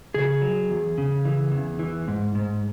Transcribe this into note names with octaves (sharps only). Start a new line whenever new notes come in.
C#3 G#4
F#3
E2
C#3
E3
E2
E3
G#2
G#2